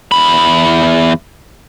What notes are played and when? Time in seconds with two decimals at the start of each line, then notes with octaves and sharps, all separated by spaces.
0.12 E2 B5